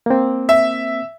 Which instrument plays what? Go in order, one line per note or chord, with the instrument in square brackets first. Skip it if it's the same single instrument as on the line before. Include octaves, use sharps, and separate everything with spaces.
[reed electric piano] A#3 C4
[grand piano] E5